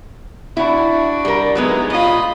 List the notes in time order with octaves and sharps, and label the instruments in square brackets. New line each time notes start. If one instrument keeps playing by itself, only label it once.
[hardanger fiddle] D4 F#4 [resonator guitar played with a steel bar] E4
[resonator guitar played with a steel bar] G3 A#4
[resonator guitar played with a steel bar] F#3 G#3 B3 [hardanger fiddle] D#4 E4
[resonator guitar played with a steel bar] A2 F4 [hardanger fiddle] D#5 B5